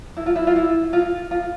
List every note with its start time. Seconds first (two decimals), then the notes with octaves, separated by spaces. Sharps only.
0.17 E4
0.26 F4
0.36 E4
0.47 F4
0.56 E4
0.93 F4
1.31 F4